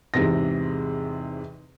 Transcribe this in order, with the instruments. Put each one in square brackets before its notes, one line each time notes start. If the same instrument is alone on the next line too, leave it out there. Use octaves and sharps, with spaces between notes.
[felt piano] E2 G#2 C3 A#6